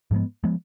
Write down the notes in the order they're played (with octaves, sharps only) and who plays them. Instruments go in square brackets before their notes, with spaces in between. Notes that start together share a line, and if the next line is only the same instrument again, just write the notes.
[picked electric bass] G#2 F3 G#3 B3
F3 G#3 B3